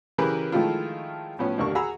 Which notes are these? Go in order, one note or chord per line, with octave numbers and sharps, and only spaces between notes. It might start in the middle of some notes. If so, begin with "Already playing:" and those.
C#3 E3 G4 G#4 A#4 B4
D#3 F3 G#3 A3 E4 F4
A2 F3 B3 C#4
A1 D#2 D3 A#4 C#6
F#4 G#4 A#5 B5 E6